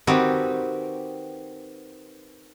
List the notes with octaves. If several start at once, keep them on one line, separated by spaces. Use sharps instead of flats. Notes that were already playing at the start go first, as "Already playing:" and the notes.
D#3 C4 F#4 G4 B4